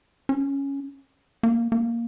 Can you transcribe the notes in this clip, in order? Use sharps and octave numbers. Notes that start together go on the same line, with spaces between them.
C#4
A#3
A#3